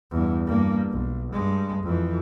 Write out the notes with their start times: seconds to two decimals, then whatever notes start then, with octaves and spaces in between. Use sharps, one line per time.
0.11 E2 G2
0.46 G2 A#3
0.90 B1
1.32 G2 G#3
1.84 F2 E3